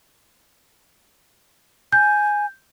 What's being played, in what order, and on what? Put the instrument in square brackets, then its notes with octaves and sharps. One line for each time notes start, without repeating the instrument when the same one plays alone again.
[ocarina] G#5 [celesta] G6